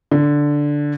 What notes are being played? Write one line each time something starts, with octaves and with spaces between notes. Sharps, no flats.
D3